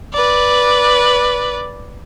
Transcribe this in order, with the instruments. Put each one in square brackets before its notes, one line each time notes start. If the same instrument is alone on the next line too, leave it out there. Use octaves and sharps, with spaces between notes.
[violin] B4 D5